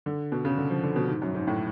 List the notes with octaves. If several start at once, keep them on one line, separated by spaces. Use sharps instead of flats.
D3
B2
C#3
D3
F3
D3
B2
G#2
F#2
G#2
A2